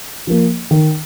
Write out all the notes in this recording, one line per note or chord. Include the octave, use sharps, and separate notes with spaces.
F3 A#3
D#3